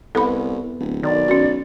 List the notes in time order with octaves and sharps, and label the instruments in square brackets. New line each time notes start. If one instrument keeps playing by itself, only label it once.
[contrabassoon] C2 [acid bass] B3 [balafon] A4 B5
[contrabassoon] D1
[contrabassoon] B1 [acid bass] D#3 [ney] D5
[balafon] C#4 F#4